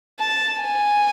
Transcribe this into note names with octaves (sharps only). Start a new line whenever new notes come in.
A5
G#5